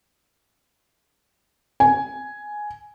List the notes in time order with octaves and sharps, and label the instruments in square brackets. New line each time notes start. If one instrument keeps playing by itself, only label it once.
[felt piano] G#5